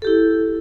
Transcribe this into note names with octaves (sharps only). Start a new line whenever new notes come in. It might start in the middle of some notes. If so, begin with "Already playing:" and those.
E4 G4 A4